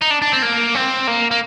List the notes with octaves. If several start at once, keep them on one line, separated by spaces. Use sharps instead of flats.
D#4
D4
D4
C4
A#3
C4
A#3
A#3